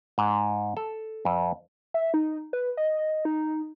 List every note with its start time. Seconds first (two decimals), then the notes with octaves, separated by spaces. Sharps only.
0.18 G#2
0.77 A4
1.25 F2
1.94 E5
2.14 D#4
2.53 B4
2.77 D#5
3.25 D#4